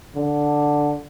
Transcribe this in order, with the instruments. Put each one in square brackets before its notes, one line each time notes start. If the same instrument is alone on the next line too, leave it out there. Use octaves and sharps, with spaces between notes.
[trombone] D3